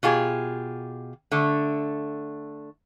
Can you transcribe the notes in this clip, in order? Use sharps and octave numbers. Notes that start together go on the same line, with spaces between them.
B2 F4 G4 G#4
D3 A3